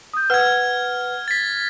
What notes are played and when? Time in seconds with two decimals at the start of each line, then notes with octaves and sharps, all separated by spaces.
0.14 D#6 G6
0.30 B4 F#5 F6 G#6
1.28 A6 B6